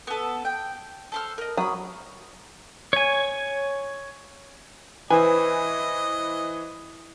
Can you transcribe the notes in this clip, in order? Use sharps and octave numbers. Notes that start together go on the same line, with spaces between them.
B3 A4
G5
A4 C5 F6
A#4 D#5
F#3 B5 D#6
C#5 G#5
E3 E4 B4 C5 D#5 E5 G#5